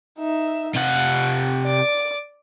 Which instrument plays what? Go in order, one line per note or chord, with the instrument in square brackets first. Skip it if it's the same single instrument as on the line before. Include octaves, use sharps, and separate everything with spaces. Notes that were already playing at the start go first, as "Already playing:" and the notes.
[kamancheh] D#4 E5
[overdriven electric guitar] C3 F#5 [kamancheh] F5
[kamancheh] D5 D6